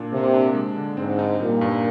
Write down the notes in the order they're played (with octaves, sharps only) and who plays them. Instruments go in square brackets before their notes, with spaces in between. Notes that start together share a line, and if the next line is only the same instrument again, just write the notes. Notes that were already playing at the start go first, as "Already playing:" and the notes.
Already playing: [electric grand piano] A#2 D4
[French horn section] C3 [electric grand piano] A#3
[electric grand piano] D4
G#3
D3
[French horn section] G#2 [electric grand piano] C4
[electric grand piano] D#4
[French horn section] A#2 [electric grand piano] G3
[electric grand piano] G2